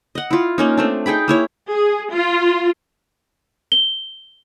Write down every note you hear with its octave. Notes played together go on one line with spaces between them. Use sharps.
D#5 F#5
E4 F4
A#3 C#4 D#4
A3 C4 D4
D#4 G#4 G5 B5
A#3 E4 C#5
G#4
F4
G7